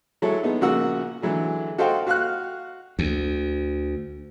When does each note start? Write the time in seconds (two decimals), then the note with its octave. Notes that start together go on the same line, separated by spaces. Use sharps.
0.22 F#3 G#3 E4 A4 C#5
0.43 G#3 B3 D#4
0.61 A#1 C#3 F#4 A#4 F#5 E6
1.22 D3 E3 F#3 G#3
1.78 F#4 A4 C5 D#5 F5 G5
2.07 F#4 F5 F6 F#6
2.99 D2